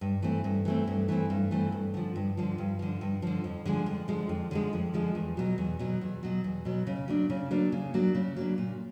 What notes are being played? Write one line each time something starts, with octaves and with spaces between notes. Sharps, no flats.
G2
E3 A3 C4
G2
E3 A3 C4
G2
E3 A3 C4
G2
E3 A3 C4
G2
D3 F3
G2
D3 F3
G2
D3 F3
G2
D3 F3
F2
D3 F3 G#3
F2
D3 F3 G#3
F2
D3 F3 G#3
F2
D3 F3 G#3
E2
B2 F#3
E2
B2 F#3
E2
B2 F#3
E2
B2 F#3
C#3
F#3 A#3 D4
C#3
F#3 A#3 D4
C#3
F#3 A#3 D4
C#3
F#3 A#3 D4
A#2